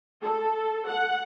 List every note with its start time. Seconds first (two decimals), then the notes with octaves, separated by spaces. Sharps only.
0.23 A4
0.89 F#5